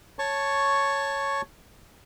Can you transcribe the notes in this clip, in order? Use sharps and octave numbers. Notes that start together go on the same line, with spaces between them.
C#5 A5 C#6